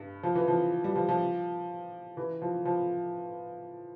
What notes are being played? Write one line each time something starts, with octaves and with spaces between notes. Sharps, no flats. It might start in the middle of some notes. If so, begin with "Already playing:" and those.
Already playing: G2
F3
E3
F3
G3
F3
F3
E3
F3
F3